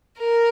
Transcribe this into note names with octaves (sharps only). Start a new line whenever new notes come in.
A#4